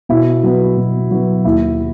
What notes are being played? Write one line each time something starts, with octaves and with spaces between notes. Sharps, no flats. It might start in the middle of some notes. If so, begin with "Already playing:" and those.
B2 E4
F#3 B3
B2
F#3 B3
D#2 E4